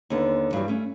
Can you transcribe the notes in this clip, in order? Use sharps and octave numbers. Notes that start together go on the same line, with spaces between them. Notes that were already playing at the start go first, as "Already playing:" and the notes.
D#2 D3 B3
G2 E3 F#3 G3
A3 C#4